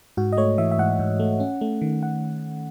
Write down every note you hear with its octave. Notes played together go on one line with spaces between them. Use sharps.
G#2 F#4
D#5
A3 C#5
E3 E5
E5
G#2 F#5
G#2
A3
C#4
A3
D#3
F#5